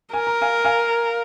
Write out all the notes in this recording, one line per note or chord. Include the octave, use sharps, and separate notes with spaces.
A#4 G#5
A#5
F5 G#5
F5 G#5